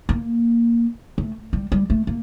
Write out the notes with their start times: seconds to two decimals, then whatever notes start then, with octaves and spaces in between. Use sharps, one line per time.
0.09 A#3
1.18 A3
1.53 G3
1.72 G3
1.90 A3
2.07 A#3